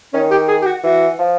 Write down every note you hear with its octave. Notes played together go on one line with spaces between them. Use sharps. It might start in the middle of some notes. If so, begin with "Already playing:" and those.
D#3 C#4
G4
G#4
G4
F#4
E3 F#4
F3